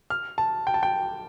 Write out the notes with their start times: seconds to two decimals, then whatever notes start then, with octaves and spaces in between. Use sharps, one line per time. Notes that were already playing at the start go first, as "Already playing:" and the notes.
0.10 F6
0.38 A5
0.67 G5
0.74 A5
0.83 G5